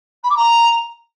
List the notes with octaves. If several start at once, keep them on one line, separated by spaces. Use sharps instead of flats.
B5
D6
A#5